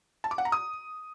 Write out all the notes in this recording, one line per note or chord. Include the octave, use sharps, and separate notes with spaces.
A5
D6
F#5
A#5
D#6